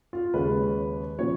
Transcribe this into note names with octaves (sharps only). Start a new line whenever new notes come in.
F4
D#2 C#3 G#3 B4
A#2 F3 C#5